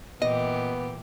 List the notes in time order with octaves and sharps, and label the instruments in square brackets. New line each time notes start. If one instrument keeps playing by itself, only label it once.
[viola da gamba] A#2 E3 G4 [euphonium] B3 [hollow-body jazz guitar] D#5